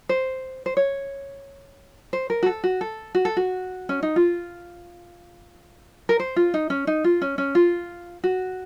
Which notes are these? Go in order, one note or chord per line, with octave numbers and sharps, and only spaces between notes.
C5
C5
C#5
C5
A#4
F#4
A4
F#4
A4
F#4
A4
F#4
C#4
D#4
F4
A#4
C5
F4
D#4
C#4
D#4
F4
C#4
C#4
F4
F#4